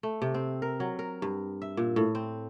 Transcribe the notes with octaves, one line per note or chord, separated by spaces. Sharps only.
A3
C3
C4
A#4
F#3
A#4
G2
E5
A#2
A2
C4